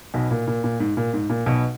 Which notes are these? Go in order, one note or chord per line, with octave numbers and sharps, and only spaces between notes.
B1 B2
A#2
A#2
A#2
G#2
A#2
G#2
A#2
B1 B2